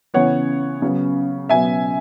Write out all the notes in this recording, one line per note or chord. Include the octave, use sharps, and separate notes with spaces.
C#3 E3 B3 C#5 F#5
C#3 F#3 B3
B2 F#3 B3 E5 G#5